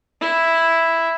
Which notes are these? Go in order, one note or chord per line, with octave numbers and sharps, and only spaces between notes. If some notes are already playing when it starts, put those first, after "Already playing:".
E4